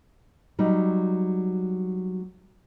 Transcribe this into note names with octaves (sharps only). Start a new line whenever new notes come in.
F#3 G3 D#4